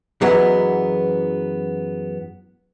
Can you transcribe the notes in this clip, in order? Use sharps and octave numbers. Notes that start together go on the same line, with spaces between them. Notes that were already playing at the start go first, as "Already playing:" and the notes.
F#2 E3 F#3 G#3 B3